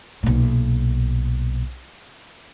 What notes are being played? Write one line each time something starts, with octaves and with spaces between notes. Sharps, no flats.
B1 A#2